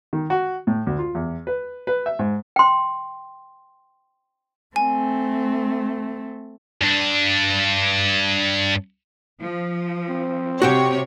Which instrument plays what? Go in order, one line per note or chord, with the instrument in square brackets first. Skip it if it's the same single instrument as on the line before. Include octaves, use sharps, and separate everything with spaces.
[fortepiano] D#3
F#4
A2
D2
F4
E2
B4
B4
E5
G#2
[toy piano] G5 C6
[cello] A3 C4 [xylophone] G#5
[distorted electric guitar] G2 D4
[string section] F3
[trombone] C4
[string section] C3 C#5 [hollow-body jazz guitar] F#4 G4 G5